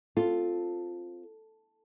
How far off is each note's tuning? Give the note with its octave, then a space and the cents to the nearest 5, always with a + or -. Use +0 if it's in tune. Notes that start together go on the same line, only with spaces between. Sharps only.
C4 +0 F4 +0 A4 +0